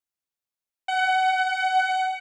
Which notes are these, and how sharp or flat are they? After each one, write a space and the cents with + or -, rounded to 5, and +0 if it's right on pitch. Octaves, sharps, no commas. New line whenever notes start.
F#5 +25